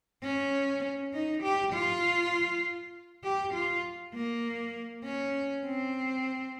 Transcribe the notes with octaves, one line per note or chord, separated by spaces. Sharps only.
C#4
D#4
G4
F4
G4
F4
A#3
C#4
C4